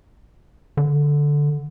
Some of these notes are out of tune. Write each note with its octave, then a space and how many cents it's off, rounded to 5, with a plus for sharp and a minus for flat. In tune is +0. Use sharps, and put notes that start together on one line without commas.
D3 -5